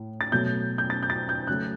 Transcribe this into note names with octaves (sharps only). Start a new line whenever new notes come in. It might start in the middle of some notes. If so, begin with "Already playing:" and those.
Already playing: A2
A6
B2 F#3 A3 G6
G6
A6
G6
A6
G6
C#3 F#3 A3 F#6